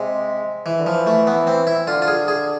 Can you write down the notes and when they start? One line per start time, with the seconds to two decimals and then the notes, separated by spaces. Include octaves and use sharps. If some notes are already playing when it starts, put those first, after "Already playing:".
Already playing: C3 G#3
0.66 E3
0.79 D3
0.86 E3 F3
1.07 A3
1.27 B3
1.47 C4
1.67 E4
1.87 D3 F4
2.02 F4
2.08 G#4
2.28 G#4